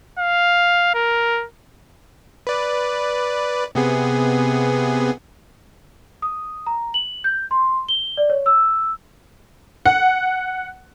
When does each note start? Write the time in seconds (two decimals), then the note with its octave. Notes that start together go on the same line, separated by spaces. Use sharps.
0.19 F5
0.94 A#4
2.47 B4 D5
3.75 C3 B3 G#4
6.22 D#6
6.66 A#5
6.94 F#7
7.24 G6
7.51 C6
7.89 G7
8.17 D5
8.30 C#5
8.46 E6
9.86 F#5